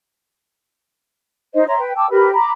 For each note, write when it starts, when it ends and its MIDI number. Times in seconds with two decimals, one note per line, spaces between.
1.55 1.64 63
1.55 1.64 72
1.55 1.64 75
1.68 1.79 73
1.68 1.79 76
1.68 1.79 82
1.68 1.79 84
1.80 1.93 71
1.80 1.93 79
1.96 2.08 79
1.96 2.08 81
1.96 2.08 86
1.96 2.08 88
2.10 2.32 67
2.10 2.32 70
2.10 2.32 71
2.10 2.32 83
2.34 2.50 82
2.34 2.50 83
2.34 2.50 86